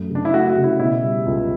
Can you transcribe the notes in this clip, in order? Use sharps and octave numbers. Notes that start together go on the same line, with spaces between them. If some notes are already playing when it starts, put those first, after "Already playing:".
Already playing: F#2 A3
C#3
D4
E4
A3 F#4
F#4
C#3
E4
B2 E4
G3
C#2